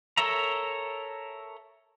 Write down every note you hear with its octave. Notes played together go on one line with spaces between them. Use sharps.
A4 A#4 C#5 E5 A#5